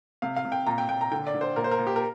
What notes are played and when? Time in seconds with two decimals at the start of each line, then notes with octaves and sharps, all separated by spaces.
0.22 C3 F5
0.36 F5
0.45 C3
0.52 G5
0.67 A#2 A#5
0.78 G5
0.89 A#2 G5
1.01 A#5
1.12 D3 G5
1.27 D5
1.34 D3
1.41 C5
1.56 A#2 A#4
1.64 C5
1.71 A#4
1.78 A#2
1.87 G4
1.96 A#4